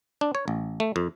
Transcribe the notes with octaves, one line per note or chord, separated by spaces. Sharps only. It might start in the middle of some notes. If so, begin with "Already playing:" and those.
D4
C#5
A1
A3
F2